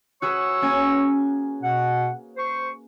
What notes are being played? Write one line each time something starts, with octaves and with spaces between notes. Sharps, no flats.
F#4 G#4 B4 C#5 C#6 E6
A#3 C#4 G#5
B2 F#5
C5 C#6